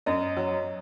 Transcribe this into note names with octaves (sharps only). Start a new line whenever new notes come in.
F#2 D#5
F#3